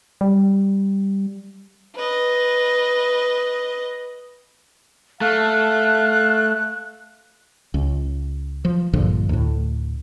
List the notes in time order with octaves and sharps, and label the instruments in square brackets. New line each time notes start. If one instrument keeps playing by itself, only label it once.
[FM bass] G3
[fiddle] B4 D#5
[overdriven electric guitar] A3 [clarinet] F5 [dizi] F#6
[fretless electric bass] C#2
F3
A#1 G2 D3 F3
D2 A2